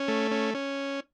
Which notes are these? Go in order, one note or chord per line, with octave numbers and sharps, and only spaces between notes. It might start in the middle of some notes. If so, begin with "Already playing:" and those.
Already playing: C#4
A3
C#4
C#4